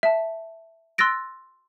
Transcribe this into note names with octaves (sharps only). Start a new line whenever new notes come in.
E5 A5
C6 E6 F#6 A6 A#6 D7